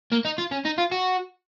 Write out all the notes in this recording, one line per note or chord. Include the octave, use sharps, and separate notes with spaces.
A#3
D#4
F4
C#4
D#4
F4
F#4